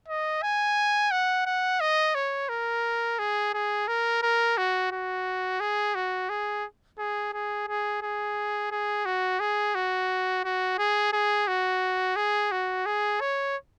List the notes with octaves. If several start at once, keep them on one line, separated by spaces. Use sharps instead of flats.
D#5
G#5
F#5
F#5
D#5
C#5
A#4
G#4
G#4
A#4
A#4
F#4
F#4
G#4
F#4
G#4
G#4
G#4
G#4
G#4
G#4
F#4
G#4
F#4
F#4
G#4
G#4
F#4
G#4
F#4
G#4
C#5